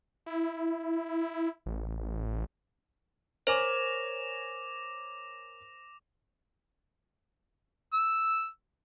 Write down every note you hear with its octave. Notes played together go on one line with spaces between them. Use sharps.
E4
A1
A#4 C5 C#5 G#5 D6 A#6 F7
E6